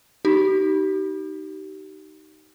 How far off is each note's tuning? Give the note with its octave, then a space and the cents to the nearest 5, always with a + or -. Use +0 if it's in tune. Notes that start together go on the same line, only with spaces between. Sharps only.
D#4 +0 G4 -35